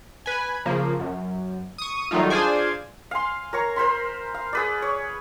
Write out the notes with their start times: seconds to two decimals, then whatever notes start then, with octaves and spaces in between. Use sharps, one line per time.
0.26 B4 G#5
0.66 C#3 F3 A#3
0.99 F#2
1.78 C#6 D#6
2.11 D#3 F#3 G3 A3 D#4 F4
2.30 D4 F4 G#4 C5 D5 G#5
3.11 F5 G#5 C6
3.53 A#4 C#5 A#5 C#6
3.76 A#4 C5 B5 C6
4.34 F5
4.53 G#4 B4 D5
4.82 C#5